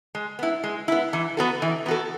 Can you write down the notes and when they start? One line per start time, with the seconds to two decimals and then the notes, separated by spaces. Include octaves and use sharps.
0.15 G#3
0.39 B3 E4
0.64 G#3
0.88 B3 E4
1.13 E3
1.37 B3 F#4 A4
1.62 E3
1.86 B3 F#4 A4